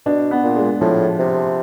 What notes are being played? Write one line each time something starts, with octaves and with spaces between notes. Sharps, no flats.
B2 D4
B3
A#2
G#3
A2 F3
C3